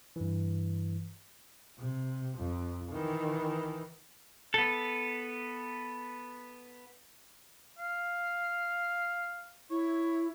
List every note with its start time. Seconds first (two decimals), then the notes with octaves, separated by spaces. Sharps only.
0.16 G2 E3
1.78 C3
2.38 F2
2.92 D#3 E3
4.54 B3 A4
7.79 F5
9.70 E4 C#5